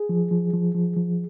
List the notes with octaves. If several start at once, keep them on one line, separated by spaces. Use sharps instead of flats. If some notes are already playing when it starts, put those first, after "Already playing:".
Already playing: G#4
F3
F3
F3
F3
F3